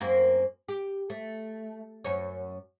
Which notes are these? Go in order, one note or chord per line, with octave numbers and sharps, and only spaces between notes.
F#2 A#3 C4
G4
A3
F#2 C#5